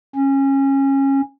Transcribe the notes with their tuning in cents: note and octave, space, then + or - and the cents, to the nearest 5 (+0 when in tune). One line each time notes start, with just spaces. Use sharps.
C#4 -20